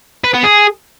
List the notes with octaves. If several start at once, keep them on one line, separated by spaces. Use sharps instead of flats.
B4
B3
G#4